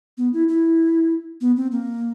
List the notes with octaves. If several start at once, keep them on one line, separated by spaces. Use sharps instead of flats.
B3
E4
E4
B3
C4
A#3